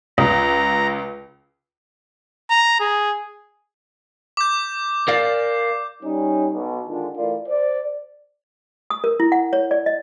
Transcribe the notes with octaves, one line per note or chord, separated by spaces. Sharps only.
C#2 A#5
A#5
G#4
D6 G6
A#4 D5 F5
G3 C#4 D#4
B1
D3 D#3 G#3 D4 F4
E3 A3 F4 A#4 D5
C5 D5
D#6
A#4
E4
F#5
C#5
D5
D#5